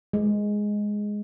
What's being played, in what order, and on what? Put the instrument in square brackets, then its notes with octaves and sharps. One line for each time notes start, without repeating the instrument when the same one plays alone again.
[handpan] G#3